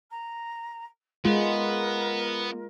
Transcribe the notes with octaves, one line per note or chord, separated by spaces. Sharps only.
A#5
G#3 B3 F4 A#4